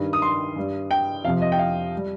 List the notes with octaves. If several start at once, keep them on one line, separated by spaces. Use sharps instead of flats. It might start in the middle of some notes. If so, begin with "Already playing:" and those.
Already playing: G2 D#3 G3
D#6
C6
G2 G3
G5
F2 C3 F3 F5
D#5
G5
F5
G3